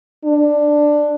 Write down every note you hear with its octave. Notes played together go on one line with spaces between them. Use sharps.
D4